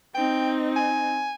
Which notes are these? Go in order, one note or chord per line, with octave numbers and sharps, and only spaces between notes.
C4 D#4 G5
G#5